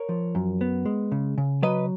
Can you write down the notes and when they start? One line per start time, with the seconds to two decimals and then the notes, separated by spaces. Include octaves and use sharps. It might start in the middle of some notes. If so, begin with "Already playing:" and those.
Already playing: A#4 C#5
0.09 F3
0.35 F#2
0.61 B3
0.86 G#3
1.12 C#3
1.38 C#3
1.63 F#3 B4 D#5